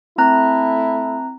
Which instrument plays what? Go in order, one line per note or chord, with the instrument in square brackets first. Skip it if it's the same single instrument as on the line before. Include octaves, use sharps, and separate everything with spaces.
[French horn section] A3 E4 [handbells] C4 A#5 F#6